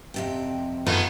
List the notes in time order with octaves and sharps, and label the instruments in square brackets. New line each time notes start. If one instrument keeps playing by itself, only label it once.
[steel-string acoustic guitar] F2 C3 G5
[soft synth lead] F#2 [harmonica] D#3 G#3 D#4 [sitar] A3 B3 [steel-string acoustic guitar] F4